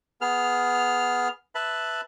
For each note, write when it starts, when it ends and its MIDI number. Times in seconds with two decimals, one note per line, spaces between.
0.21 1.28 59
0.21 1.28 68
0.21 1.28 89
1.55 2.01 71
1.55 2.01 76
1.55 2.01 81
1.55 2.01 83